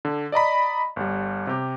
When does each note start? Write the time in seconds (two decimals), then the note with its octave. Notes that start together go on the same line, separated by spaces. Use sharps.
0.05 D3
0.32 D5 D#5 A#5 B5
0.96 G1 G3
1.47 C3 G4